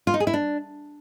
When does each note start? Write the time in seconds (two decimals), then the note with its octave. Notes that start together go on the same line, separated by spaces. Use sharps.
0.07 F4
0.14 D#4
0.20 G#4
0.27 E4
0.34 D4